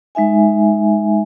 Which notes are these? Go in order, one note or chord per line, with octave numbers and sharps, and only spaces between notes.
G#3 D#4 E5 G#5